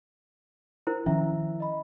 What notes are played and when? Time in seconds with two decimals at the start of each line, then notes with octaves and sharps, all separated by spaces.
0.87 E4 A#4 C5
1.06 D#3 F3 C#4 E4 E5 A#5
1.60 D#5 B5